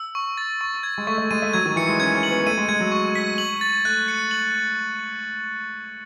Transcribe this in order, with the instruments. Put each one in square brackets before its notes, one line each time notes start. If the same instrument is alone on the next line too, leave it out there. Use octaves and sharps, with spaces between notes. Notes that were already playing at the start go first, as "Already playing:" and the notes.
Already playing: [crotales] E6
C#6
A6
C#6
G#6
[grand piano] G#3
[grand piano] A3 [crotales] C#6
[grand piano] A3
[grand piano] G#3 [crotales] D#7
[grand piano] A3
[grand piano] F#3 [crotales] G#6
[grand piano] D#3
[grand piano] E3 [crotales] C#7
[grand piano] G#3
[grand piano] C#4 [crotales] G#6
[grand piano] C#4
[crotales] F#7
[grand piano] B3
[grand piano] A3 [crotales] D#7
[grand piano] G#3
[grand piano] G#3 [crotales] G#6
[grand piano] F#3
[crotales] C#6
B6
F#7
A6
[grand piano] A3 [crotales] F#6
[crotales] C#7
F#7